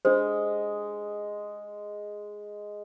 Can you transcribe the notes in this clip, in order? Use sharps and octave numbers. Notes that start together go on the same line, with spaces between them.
G#3 D4 C5